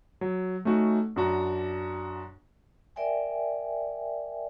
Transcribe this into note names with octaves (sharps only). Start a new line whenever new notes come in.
F#3
A3 C#4 D#4 F#4
F#2 D4 F#4 A#5
A#4 D5 E5 G5 G#5